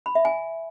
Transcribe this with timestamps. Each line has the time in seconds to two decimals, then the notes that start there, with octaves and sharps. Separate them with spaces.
0.06 B5
0.15 E5
0.25 G#5